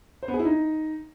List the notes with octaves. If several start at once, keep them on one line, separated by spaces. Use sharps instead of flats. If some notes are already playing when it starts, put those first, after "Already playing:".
C5
B3
G#4
E4
D#4